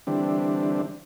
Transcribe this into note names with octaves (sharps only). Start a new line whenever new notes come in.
D3 E3 G3 C4 D4